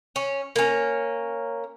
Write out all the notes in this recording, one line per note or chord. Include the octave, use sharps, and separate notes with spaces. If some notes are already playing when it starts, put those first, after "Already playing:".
C#4
A#3 C#4